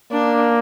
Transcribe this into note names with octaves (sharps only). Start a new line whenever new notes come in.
A#3 D4